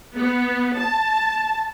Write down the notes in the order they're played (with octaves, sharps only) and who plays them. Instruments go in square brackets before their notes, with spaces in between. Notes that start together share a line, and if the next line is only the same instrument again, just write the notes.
[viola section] B3
A5